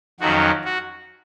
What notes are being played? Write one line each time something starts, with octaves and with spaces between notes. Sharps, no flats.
F2 D#3 F#3 C#4 F#4
F#4